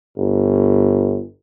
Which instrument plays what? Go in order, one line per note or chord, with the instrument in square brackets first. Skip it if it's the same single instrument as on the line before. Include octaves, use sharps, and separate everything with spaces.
[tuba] G1